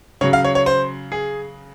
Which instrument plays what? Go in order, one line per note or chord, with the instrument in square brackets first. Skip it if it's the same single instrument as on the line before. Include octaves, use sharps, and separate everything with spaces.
[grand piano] C#3 F#3 C#5
F5
C#5
C#5
C5
G#4